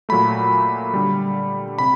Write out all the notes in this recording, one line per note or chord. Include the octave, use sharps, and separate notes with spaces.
A#2 F#3 A3 B5
D3 G3
C3 B5